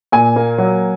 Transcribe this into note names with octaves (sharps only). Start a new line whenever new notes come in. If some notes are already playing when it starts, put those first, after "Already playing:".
A#2 G#5
A#3
F#3